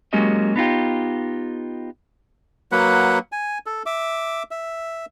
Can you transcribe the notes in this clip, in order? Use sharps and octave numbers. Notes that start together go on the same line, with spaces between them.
F#3 G#3 A#3 C#4 G4 D#5
B3 D#4 F4 G4
F#3 A#3 B4 F#5
G#5
A4
E5 D6
E5